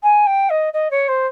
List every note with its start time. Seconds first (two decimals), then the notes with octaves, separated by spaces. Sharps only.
0.03 G#5
0.26 G5
0.49 D#5
0.73 D#5
0.90 C#5
1.08 C5